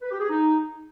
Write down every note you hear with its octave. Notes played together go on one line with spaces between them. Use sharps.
B4
G4
G#4
D#4